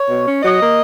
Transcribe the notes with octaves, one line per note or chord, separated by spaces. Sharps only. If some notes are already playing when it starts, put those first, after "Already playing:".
Already playing: C#5
B2
C#4
F#3 D#5
A#3